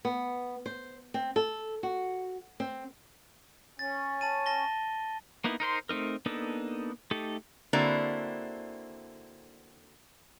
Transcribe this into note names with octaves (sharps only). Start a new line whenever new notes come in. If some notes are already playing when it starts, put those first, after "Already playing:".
B3
C5
C4
A4
F#4
C4
C#4 A6
A5 A6 D#7
A5 A#6 G7
A#3 B3 D#4 E4
D#4 A#4 C5 C6
A3 C4 D#4 A#4
A#3 B3 D4 D#4 A4
A3 D#4 G4 A4
D3 A#3 C4 E4 F#4 D5